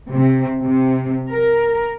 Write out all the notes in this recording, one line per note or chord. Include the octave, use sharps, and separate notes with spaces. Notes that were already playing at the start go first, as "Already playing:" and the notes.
C3
C3
A#4